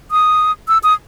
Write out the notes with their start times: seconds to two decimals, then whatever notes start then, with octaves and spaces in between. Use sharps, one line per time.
0.11 D#6
0.68 E6
0.83 D#6